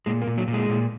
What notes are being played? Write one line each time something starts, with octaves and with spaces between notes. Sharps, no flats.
A#2 G#3
A#3
A#2
F#3
A#2
G#3
A#2